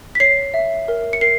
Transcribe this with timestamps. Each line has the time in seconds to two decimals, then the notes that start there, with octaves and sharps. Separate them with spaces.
0.15 B6
0.20 C#5 C7
0.54 E5
0.88 A#4
1.13 C#7
1.21 A#4 C7